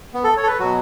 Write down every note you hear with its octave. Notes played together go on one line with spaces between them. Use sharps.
B3
A4
C#5
A4
B4
B2 F#3 F#4